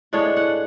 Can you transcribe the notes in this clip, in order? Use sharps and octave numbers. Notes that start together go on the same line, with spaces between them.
A2 G#3 D4 C#5
F#5